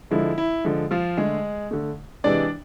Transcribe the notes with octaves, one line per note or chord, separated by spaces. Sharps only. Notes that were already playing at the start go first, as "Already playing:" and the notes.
D3 F3 G#3 E4
E4
D3 F3 G#3
F3 F4
D3 G#3 A3 G#4
D3 A3
C3 E3 G#3 D4 D5